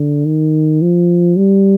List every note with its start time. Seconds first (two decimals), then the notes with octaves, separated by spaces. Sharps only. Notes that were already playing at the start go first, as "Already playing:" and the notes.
Already playing: D3
0.25 D#3
0.82 F3
1.38 G3